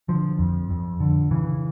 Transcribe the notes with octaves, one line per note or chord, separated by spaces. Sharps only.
D3 F3
F2
F2
D3
C#3 E3